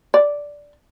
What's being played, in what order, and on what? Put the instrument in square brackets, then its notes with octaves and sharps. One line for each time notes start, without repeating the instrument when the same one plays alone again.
[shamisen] D5